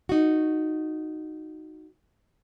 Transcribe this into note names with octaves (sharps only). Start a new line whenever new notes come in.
D#4 F#4